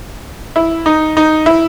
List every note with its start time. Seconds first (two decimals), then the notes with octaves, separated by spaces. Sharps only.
0.56 E4
0.86 D#4
1.17 D#4
1.46 E4